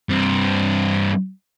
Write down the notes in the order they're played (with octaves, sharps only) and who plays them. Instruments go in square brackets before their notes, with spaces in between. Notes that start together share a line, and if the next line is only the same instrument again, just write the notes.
[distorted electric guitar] G2 C4